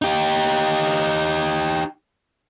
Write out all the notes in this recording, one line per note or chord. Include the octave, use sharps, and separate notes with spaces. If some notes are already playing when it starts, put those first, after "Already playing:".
D#4 G4